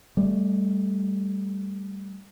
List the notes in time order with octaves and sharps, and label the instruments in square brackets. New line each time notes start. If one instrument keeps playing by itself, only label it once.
[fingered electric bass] G3 A3